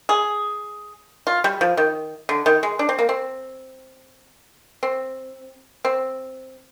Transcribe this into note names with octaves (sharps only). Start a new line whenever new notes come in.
G#4
F4
G3
F3
D#3
D3
D#3
G#3
D4
C4
A#3
C4
C4
C4